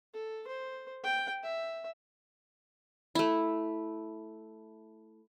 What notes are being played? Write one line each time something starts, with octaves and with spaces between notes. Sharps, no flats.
A4
C5
G5
E5
A3 E4